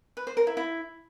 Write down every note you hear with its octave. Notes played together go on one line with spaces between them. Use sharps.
B4
C5
A#4
E4
E4